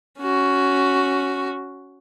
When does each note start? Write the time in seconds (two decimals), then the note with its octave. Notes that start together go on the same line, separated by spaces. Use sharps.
0.20 C#4 F#4